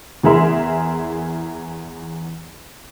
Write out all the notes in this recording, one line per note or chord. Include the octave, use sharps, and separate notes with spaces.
E2 E3 G#4 A#4 E5 C6